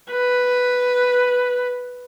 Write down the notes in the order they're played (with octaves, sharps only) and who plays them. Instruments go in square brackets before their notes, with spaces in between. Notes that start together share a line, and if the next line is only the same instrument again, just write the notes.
[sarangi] B4